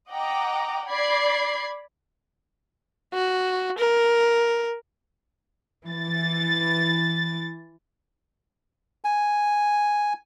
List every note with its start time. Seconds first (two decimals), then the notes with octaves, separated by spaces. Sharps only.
0.11 D#5 F#5 G5 A#5 D6
0.87 D5 B5 G#6 C7
3.14 F#4
3.79 A#4
5.85 E3 A6
9.04 G#5